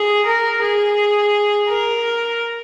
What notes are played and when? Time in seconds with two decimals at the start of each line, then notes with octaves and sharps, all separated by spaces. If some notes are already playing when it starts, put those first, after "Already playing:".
Already playing: G#4
0.26 A#4
0.62 G#4
1.69 A#4